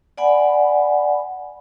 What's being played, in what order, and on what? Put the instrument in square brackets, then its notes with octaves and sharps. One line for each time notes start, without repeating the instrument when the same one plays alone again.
[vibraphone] D5 F#5 G#5 B5